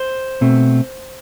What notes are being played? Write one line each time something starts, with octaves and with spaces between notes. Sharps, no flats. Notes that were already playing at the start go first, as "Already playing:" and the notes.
Already playing: C5
B2 A3 C4